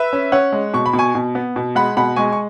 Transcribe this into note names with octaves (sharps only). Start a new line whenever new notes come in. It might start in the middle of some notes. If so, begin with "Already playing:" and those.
Already playing: B4 E5
C#4
C#4 C#5 F#5
G#3
B2 C#6
B5
B2
G#5 C#6
B2
B3
B2
G#3 F#5 B5
B2 F#5 B5
G#3 G#5 C#6
C#6